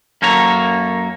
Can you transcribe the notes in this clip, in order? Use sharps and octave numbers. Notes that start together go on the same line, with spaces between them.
F#2 A#3 A4 C#5 A#5